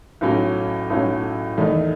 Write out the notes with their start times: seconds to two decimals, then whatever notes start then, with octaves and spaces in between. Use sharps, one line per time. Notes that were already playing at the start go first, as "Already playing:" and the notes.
0.21 B1 A2 F#3 C#4
0.90 B1 A2 F#3 C#4
1.58 E2 D#3 A3 D#4